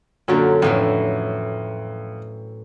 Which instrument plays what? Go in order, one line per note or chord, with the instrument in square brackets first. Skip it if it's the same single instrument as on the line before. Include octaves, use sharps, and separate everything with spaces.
[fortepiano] F#2 A#2 F#3 [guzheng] D3 C#4
[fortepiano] F2 [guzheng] A2 E3 F#3